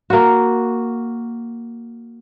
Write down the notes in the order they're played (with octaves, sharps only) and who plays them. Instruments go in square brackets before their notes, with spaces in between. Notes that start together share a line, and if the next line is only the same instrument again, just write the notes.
[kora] A#3 F#4